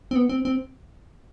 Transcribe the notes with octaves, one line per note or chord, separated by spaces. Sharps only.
C4
B3
C4
C4